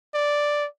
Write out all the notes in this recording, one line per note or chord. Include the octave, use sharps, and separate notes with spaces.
D5